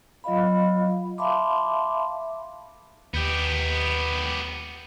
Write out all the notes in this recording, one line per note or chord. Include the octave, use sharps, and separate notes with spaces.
F#3 F4 D#5 F5 B5
E5 F5 A5 B5 C6 D6
D#2 B3 G4 G6